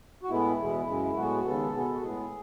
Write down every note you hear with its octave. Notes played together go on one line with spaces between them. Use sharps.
F#4
A2 G#3 B3 E4
E2 B2 G#3 B3
F#2 C#3 G#3
A2 G#3 B3 F#4
D#2 C#3 G#3 B3 A4
B2 G#3 B3
F#4
A2 G#3 B3 G#4